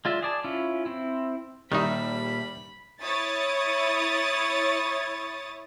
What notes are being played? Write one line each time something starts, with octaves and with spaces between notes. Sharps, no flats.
G#3 F4 D5 E5
G#4 D5 A5
C#4 E4 F4
C4 E4
A#2 D#3 G3 D#4 E5 B5
E4 C#5 D#6 A6